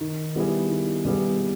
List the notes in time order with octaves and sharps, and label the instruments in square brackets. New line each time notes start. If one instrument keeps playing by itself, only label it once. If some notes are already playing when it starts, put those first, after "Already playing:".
[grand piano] D#3
G3 B3 E4 G#4
D#3
G3 B3 E4 G#4